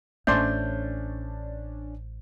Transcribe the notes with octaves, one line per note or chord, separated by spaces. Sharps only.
A1 A3 C#4 D4 C5 D5 C6 G6